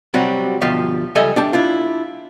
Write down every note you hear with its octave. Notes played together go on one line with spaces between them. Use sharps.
C3 F#3 G3 C4 F#4
D2 B2 F3 G4 F5
C#2 G3 A4 D#5 E5 G#5
D4 G4 A5
D4 E4 F4